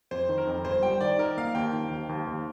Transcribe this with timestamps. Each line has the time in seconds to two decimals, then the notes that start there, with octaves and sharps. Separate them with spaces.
0.11 F2 C5
0.29 D#3
0.38 A#4
0.47 F2
0.65 G1 C5
0.83 G3 G5
1.01 D#3 D5
1.19 D#4 A#4
1.37 A#3 F5
1.55 D#2 G5
1.73 D#3
1.91 D#2
2.09 D#2
2.27 D#2